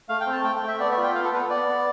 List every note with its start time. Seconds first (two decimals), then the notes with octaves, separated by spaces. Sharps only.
0.09 A3 F5
0.21 G5
0.26 C4
0.32 A5
0.44 A3 G5
0.56 G5
0.62 A3
0.68 E5
0.79 B3 D5
0.91 E5
0.98 F4
1.03 G5
1.15 B3 F5
1.24 A4
1.33 B3 B4
1.50 B3 D5
1.68 B3